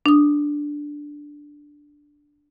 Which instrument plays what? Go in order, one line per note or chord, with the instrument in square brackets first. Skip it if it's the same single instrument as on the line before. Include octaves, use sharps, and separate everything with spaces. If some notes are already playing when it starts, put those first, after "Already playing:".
[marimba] D4 D#6